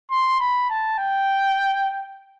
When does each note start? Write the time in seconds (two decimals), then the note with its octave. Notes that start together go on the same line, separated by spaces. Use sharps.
0.11 C6
0.40 B5
0.70 A5
0.99 G5